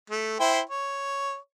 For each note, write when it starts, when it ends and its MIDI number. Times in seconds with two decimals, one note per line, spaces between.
0.10 0.38 57
0.40 0.60 64
0.40 0.60 72
0.40 0.60 79
0.69 1.36 73